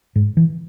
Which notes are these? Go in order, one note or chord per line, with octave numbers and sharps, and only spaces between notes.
G#2
E3